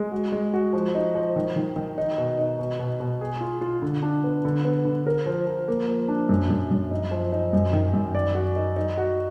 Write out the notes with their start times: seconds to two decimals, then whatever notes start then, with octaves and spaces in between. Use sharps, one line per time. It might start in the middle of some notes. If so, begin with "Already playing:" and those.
Already playing: G#3
0.12 F#4
0.32 G#3
0.54 F#4
0.73 F3
0.95 D#4
1.15 F3
1.36 D#3
1.56 D#3
1.76 D#3
1.98 D#4
2.18 B2
2.39 D#4
2.59 B2
2.79 B2
3.00 B2
3.21 G#4
3.41 F4
3.61 F4
3.82 D3
4.02 D4
4.24 B3
4.45 D3
4.65 B3
4.85 D3
5.07 A#4
5.26 F3
5.47 F3
5.68 A#3
5.88 F3
6.08 D4
6.29 F#2
6.50 F#2
6.71 F#2
6.91 D#4
7.11 F3
7.32 D#4
7.53 F#2
7.73 D#3
7.94 F#2
8.15 D5
8.35 F#4
8.56 D#4
8.76 D#4
8.98 F#4